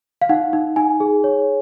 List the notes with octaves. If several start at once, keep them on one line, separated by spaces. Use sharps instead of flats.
F5
D#4 F#5
D#4
D#4 G#5
G#4
C#5